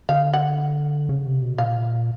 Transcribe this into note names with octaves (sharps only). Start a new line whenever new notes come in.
D3 F5
F#5
C#3
C3
B2
A#2 F5